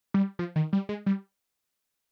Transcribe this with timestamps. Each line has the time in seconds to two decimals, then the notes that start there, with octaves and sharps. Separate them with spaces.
0.14 G3
0.39 F3
0.56 D#3
0.73 G3
0.89 G#3
1.06 G3